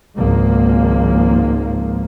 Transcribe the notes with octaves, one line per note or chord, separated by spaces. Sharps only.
G#1 C#2 G#2 F3 A#3